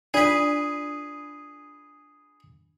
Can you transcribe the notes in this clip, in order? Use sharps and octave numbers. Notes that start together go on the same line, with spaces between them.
D4 F4 G#4 B4 D5